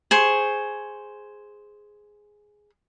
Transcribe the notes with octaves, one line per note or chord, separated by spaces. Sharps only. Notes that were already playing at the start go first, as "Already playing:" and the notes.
G#4 C5 C#6